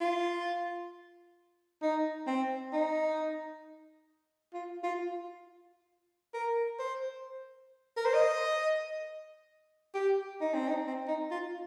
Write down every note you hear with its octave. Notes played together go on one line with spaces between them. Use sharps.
F4
D#4
C4
D#4
F4
F4
A#4
C5
A#4
C5
D#5
G4
D#4
C4
D#4
C4
D#4
F4